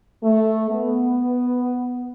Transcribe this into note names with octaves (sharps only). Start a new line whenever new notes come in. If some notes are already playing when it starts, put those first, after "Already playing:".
A3
B3